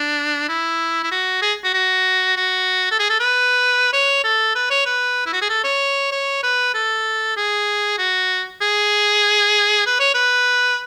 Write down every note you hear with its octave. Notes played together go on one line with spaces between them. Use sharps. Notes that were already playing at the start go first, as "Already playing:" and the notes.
Already playing: D4
E4
E4
F#4
G#4
F#4
F#4
F#4
A4
G#4
A4
B4
C#5
A4
B4
C#5
B4
E4
F#4
G#4
A4
C#5
C#5
B4
A4
G#4
F#4
G#4
B4
C#5
B4